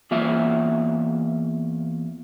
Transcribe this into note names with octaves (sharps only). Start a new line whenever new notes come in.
E2 A#3 F4 E5